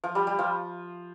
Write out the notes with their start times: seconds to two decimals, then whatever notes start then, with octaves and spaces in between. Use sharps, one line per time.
0.04 F3
0.15 G3
0.27 G3
0.39 F3